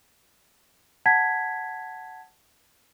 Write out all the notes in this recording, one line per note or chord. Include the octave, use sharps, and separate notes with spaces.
F#5 A5 G#6 B6